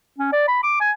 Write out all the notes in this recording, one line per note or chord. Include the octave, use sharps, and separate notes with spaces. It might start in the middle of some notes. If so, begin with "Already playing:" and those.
C#4
D5
B5
D6
G#5